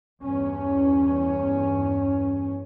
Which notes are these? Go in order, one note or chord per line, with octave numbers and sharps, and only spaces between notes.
E2 G2 C#4